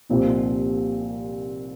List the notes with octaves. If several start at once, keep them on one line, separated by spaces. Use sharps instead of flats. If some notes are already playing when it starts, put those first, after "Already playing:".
C2 A#2 F3 C4 D#4